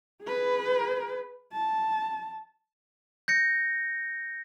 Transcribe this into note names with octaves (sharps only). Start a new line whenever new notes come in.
G#4 B4
A5
G6 A#6 C#7